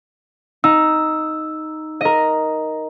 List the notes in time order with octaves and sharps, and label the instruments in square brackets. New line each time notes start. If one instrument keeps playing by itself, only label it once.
[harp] D#4 [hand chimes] E6
[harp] A#4 D#5